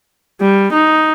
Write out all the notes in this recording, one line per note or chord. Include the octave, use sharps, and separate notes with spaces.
G3
D#4